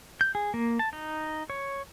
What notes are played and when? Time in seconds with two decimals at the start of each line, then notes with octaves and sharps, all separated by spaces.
0.21 G6
0.35 G#4
0.54 A#3
0.79 A5
0.93 D#4
1.50 C#5